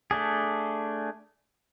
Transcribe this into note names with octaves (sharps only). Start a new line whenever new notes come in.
A3 D4 G#4